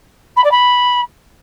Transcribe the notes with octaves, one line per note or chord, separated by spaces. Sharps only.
B5
D5
B5